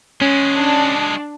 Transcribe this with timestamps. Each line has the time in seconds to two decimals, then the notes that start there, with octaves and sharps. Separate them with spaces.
0.21 G#3 C#4 F#4
0.56 D4